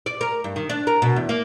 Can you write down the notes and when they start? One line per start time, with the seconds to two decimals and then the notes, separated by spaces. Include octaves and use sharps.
0.06 D5
0.21 A#4
0.44 G2
0.56 D#3
0.70 D4
0.87 A#4
1.02 B2
1.16 E2
1.29 A#3